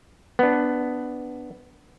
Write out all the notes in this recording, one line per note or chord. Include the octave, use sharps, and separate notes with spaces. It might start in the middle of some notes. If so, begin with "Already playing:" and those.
B3 D4